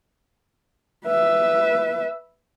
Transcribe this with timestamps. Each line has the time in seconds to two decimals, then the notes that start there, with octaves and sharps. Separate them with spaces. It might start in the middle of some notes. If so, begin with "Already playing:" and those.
1.06 B4 E5